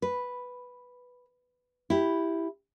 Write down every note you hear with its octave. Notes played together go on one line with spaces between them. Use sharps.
B4
E4 G4